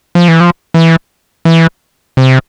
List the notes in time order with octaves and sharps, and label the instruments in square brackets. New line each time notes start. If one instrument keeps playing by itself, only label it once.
[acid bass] F3
E3
F3
E3
E3
C3